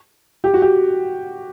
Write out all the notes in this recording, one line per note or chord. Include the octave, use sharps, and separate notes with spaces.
G4
F#4
G4